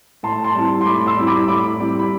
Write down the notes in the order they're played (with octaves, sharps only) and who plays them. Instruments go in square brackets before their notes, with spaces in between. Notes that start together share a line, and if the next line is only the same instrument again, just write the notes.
[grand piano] A2 [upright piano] A5 C6
[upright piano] A5 C6
[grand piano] G3 C4 E4
[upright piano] C6
[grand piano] A2 [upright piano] B5 D6
[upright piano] C6 E6
[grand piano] G3 C4 E4
[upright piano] B5 D6
[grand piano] A2 [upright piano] B5 D6
[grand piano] G3 C4 E4
[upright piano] B5